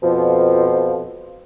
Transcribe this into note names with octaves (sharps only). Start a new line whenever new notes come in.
F2 B2 F3